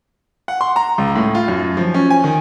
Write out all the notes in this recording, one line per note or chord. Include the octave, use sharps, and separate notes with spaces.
F#5
C6
A#5
C#2
A2
F4
F#2
F3
C#4
G#5
D#3